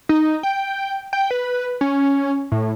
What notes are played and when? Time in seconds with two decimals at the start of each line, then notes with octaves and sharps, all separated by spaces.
0.09 D#4
0.43 G5
1.13 G5
1.31 B4
1.81 C#4
2.52 A2